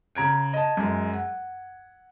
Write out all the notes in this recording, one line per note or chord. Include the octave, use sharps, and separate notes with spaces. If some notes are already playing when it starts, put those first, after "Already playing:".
C#3 A#5 G#6 D7
D#5 A5
F#2 G#3
F#5